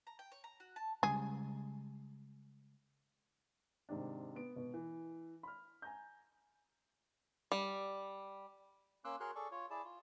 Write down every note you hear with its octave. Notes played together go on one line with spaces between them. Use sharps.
A#5
G5
C#5
A#5
F#4
A5
C#3 G3 G#3 G#4
G#2 C3 D#3 D4
B3 D7
G#1 B2 B3
E3
B5 F6
G#5 A#5 G6
G3
A#3 C#4 C6 D6 E6 F#6
F#4 G#4 A#4 C#5 C6 F#6
G#4 A4 D5 C#6
F4 C#5
E4 G#4 D5 A5
F4